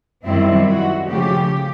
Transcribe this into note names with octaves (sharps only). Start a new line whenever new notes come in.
F#2 D#3 G3 C4 E4
F#4
C#3 F3 A3 G4